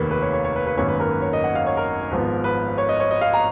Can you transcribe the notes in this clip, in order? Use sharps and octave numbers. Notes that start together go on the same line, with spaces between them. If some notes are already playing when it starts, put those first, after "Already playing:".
Already playing: F1 D#2 D#3 A#3 B4 C#5
B4
C#5
C#5
C#5
B4
B4
G#1 F#2 D#3 A#3 C#5
B4
A#4
B4
C#5
D#5
F#5
F5
C#5
A#4
G#1 G#2 F3 B3
B4
C#5
D#5
C#5
D#5
F5
A#5